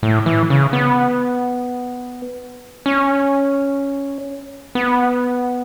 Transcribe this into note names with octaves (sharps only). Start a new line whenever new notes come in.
A2
E3
C#3
B3
C#4
B3